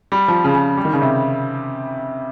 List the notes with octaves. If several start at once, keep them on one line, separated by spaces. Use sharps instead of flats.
G3
F3
C#3
C#3
G3
D#3
C#3
C3